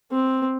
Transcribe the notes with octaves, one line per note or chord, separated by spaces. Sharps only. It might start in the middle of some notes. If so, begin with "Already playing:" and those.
C4